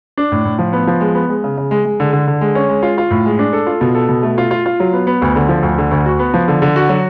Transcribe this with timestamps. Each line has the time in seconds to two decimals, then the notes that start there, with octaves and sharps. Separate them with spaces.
0.18 D4
0.32 A2
0.45 A2
0.59 F3
0.73 B3
0.87 F3
1.01 G#3
1.15 B3
1.29 G#3
1.44 C#3
1.58 C#3
1.71 G#3
1.85 G#3
2.00 D3
2.13 D3
2.27 D3
2.41 G#3
2.55 C#4
2.69 G#3
2.83 F4
2.98 F4
3.11 A2
3.26 G#3
3.39 D4
3.53 A4
3.67 F4
3.81 B2
3.95 A4
4.09 B2
4.23 A3
4.38 F4
4.51 F4
4.66 F4
4.80 F#3
4.93 B3
5.07 B3
5.22 D2
5.36 D3
5.49 F3
5.63 D2
5.78 D3
5.91 D2
6.06 F#4
6.19 B3
6.34 F3
6.48 D3
6.62 D3
6.76 F#4
6.89 F#3